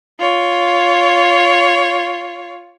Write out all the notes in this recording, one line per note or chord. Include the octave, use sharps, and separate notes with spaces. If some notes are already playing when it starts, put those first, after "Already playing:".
F4 C#5